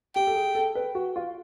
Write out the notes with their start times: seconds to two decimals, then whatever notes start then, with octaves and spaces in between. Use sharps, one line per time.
0.16 G4 G5
0.27 A4
0.35 G#4
0.55 A4
0.75 B4
0.95 F#4
1.16 F4